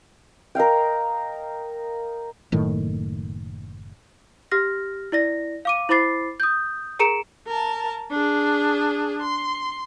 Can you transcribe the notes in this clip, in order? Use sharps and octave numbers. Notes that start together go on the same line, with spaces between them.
A#4 D#5 F5 G5
F#1 A2 D#3
G4 F6 A#6
E4 D5 A#6
F5 D6 D#7
E4 C5 B5 D6 A6 C7
D#6 G6
G#4 A#4 A#5 C#7 D7 E7
A#4 A5
D4 G#4
C6